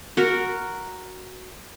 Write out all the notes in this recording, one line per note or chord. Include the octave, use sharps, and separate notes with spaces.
F#4 A#4